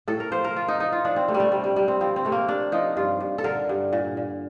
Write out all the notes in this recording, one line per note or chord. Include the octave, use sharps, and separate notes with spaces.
A2 A4
A#4
F3 C5
A#4
F3 F4
D#4
F3 D#4
F4
F3 D4
C4
C3 A3
G3
A3
C3 G3
G3
C3 G3
C4
F3 C4
C4
C3 A3
A#3
C3 D4
F3 D#4
G2 F4
G2
A4
D3 A#4
G2
A#2
A#2